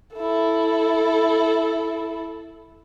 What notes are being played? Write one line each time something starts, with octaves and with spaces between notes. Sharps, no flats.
E4 A4